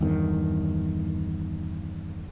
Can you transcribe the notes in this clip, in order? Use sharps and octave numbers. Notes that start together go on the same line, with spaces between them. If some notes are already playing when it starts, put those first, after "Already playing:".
E2 G2 D#3